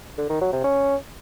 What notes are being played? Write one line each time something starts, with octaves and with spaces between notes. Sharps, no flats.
D3
D#3
F#3
C3
C#4